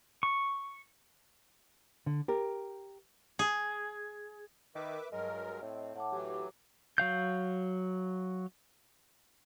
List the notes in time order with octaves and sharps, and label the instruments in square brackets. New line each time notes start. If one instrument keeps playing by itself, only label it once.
[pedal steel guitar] C#6
[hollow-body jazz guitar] D3
G4 A#4
[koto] G#4
[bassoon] D#3 [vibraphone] A#4 [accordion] B4 E5 D6
[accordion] G2 F#3 A#4 [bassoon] G#3 [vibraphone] D#5
[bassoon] A2 [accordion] C4
[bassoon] A2 [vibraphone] F#5 A5 D6
[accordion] E3 F#3 [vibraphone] G4 D6
[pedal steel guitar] F#3 F5 G6